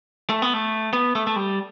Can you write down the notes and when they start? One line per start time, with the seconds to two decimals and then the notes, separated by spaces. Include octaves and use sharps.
0.30 A3
0.42 B3
0.54 A3
0.93 B3
1.15 A3
1.27 A3
1.36 G3